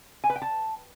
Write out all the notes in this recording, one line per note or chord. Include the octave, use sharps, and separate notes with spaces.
G#5
B4
G5
A5